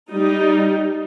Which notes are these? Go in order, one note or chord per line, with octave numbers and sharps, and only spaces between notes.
G3 D#4